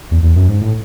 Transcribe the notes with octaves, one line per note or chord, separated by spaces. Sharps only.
E2
E2
F#2
G#2
A2